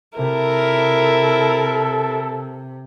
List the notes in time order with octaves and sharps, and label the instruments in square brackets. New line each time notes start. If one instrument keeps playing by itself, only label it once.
[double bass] C3 [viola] E4 A#4 [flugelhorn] A4